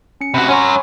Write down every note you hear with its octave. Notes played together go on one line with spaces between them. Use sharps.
C#4 C#7
C3 F#4 F#5 B5
C#4 G#5 A#5 C6 C#6
B5